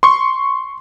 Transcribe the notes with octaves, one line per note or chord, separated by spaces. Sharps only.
C6 C#6